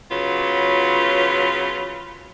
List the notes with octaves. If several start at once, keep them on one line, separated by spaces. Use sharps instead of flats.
C#3 F#3 B3 F4